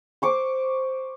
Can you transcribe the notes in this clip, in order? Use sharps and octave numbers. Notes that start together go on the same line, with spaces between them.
C5 C#6 D6